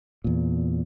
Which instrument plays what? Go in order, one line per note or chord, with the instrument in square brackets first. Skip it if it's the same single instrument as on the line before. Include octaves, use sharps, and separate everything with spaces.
[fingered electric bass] E2 A#2